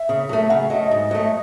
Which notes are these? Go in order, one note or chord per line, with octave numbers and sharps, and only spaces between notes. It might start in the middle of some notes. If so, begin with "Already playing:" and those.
Already playing: E5
C#3
F#3 A3
C#3 F#5
E5
F#3 A3 D#5
D#5
G#2
F#3 A3